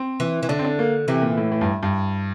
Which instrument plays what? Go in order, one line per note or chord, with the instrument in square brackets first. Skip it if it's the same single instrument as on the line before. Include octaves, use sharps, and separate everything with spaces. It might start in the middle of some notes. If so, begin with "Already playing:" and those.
Already playing: [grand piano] C4
[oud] E3
E3
[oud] D3 [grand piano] D4
[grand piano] C4
D4
A#3
[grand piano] C3 [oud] E3
[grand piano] A#2
A2
A2
G2
G2